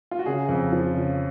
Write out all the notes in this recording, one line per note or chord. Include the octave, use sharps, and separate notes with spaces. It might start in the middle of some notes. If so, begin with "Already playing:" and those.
F4
F#4
C#3 G#4
F2
F3
C#3